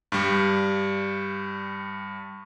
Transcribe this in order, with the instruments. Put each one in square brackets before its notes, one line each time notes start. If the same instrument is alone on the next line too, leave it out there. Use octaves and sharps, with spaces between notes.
[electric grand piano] G2 G3